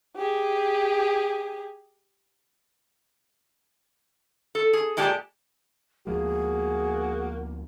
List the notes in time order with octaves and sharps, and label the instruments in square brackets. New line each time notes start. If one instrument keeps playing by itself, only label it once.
[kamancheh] G4 G#4
[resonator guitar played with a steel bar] A4
G#4
A#2 G#3 G4 D5 A5
[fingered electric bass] D2 F3 G#3 [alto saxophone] A#3 [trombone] F#4 [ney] G#4